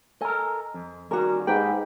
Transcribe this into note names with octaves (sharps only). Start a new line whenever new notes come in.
A4 A#4 D#5 G#5
F2
D#3 G3 C#4 F#4 A#4
G#2 D#4 G4 B4 G5